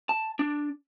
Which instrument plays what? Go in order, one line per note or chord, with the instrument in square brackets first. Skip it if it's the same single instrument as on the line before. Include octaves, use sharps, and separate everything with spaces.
[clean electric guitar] A5
D4